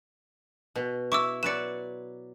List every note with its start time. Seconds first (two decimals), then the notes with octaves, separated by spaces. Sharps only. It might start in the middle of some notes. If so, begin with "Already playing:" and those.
0.76 B2
1.12 E4 C#6 D6 E6
1.43 F#3 B4 D5 C#7 E7